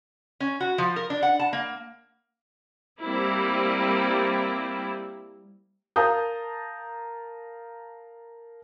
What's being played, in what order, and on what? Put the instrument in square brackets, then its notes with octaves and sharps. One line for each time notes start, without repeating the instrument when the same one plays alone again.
[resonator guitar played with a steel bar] C#4
F#4
F3
A#4
D4
F#5
A5
A#3
[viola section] G3 A#3 C4 E4
[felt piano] A#4 F5 A5 A#5 D#6 G6